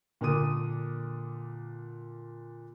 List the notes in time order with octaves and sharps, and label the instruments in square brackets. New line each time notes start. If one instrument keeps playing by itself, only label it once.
[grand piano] A#2 D3 A#4 D6 D#6 D#7